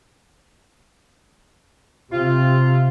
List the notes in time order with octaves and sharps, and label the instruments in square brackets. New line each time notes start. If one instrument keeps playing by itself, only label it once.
[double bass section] C3 [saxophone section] F4